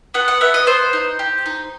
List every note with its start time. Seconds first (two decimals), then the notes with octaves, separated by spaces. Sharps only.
0.14 B3 F#5
0.28 F#5
0.41 B3 E5
0.54 D#5
0.67 B3 C5
0.93 D#4
1.19 G4
1.46 D#4